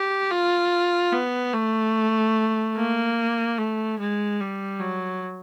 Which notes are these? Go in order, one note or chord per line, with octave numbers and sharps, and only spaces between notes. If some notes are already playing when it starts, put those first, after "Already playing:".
Already playing: G4
F4
B3
A3
A#3
A3
G#3
G3
F#3